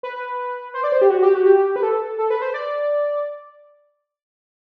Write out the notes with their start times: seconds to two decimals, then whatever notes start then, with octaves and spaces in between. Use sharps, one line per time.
0.03 B4
0.74 C5
0.84 D5
0.92 C5
1.01 G4
1.10 F#4
1.23 G4
1.35 F#4
1.46 G4
1.76 B4
1.83 A4
2.18 A4
2.30 B4
2.42 C5
2.54 D5